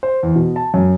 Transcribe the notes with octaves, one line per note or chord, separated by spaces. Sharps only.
C5
E2
B2
A5
F#2